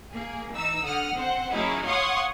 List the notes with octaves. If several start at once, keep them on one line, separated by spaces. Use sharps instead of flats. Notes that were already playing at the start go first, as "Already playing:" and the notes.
A#3 G#4
E3 D#4 E6
D3 F#5 D#6 F6
C4 C5 F#5
F#3 A#3 C#4 D#4 E4 G#4
C#5 F5 F#5 C6 C#6 D#6